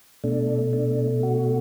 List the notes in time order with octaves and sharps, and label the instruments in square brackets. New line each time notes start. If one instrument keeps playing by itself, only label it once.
[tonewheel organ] B2 A3 D4
D4
F#4